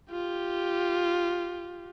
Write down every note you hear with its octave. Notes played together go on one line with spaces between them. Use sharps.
F4 G4